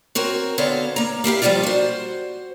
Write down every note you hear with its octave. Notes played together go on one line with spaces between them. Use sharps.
C4 F#4 A#4 C#5
D3 B3 C4 A4 C#5 F5
A#3 A#5
A#3 E4 G4 F5
F3 G3 G#3 D4 D#4 F4
F#4 C5